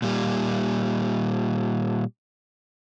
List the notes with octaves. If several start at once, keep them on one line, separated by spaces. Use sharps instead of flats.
A#2 G3